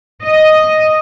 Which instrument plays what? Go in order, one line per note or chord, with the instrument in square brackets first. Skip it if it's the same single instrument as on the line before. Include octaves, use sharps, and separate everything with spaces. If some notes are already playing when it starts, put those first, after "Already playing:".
[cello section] D#5